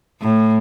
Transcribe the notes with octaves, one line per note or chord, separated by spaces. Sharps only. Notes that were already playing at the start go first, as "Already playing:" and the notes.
A2